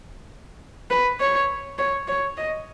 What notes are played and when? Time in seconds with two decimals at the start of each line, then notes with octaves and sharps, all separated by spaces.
0.90 B4
1.20 C#5
1.78 C#5
2.08 C#5
2.37 D#5